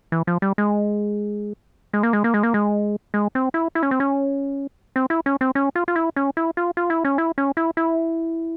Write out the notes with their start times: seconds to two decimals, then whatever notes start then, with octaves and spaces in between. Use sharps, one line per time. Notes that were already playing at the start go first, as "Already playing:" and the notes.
0.12 E3
0.27 F3
0.42 G3
0.58 G#3
1.93 G#3
2.03 A#3
2.13 G#3
2.24 A#3
2.34 G#3
2.43 A#3
2.54 G#3
3.14 G#3
3.35 C4
3.54 E4
3.75 E4
3.83 C#4
3.91 C4
4.00 C#4
4.96 C4
5.10 E4
5.26 C#4
5.41 C4
5.55 C#4
5.75 F4
5.88 F4
5.96 E4
6.16 C#4
6.37 E4
6.57 F4
6.77 F4
6.90 E4
7.05 C#4
7.18 E4
7.38 C#4
7.57 E4
7.77 E4